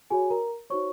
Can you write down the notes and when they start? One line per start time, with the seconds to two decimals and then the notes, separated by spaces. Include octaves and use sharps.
0.10 F#4 G#4 C#5 G#5
0.30 A#4 A#5
0.70 D#4 F#4 C5 C#5 C#6